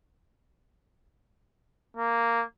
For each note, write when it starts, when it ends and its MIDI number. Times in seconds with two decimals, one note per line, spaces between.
1.97 2.43 58